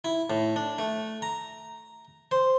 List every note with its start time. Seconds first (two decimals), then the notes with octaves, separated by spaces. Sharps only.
0.05 E4
0.30 A2
0.56 D4
0.78 A3
1.22 A#5
2.31 C5